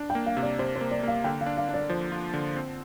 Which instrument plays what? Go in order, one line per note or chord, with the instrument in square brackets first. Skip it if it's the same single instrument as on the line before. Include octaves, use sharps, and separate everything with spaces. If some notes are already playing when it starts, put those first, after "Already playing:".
Already playing: [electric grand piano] D4
[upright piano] G5
[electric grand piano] A#3
[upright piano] F5
[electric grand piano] C3
[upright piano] D5
[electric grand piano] C3 [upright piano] C5
[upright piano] C5
[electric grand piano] A#3
[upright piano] D5
[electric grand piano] A#3 [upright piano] F5
[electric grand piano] D3 [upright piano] G5
[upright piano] F5
[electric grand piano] D4
[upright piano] F5
[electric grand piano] D4
[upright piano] D5
[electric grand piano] F3 [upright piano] C5
[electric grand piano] F4
D3
C4